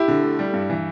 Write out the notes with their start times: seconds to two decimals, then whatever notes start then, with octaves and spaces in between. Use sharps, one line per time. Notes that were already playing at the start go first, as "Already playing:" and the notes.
Already playing: E4 G4
0.08 D3
0.23 A3
0.39 G3
0.53 G2
0.70 E3